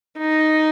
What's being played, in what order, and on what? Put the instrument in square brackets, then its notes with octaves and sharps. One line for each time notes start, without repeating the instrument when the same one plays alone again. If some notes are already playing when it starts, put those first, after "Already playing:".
[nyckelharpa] D#4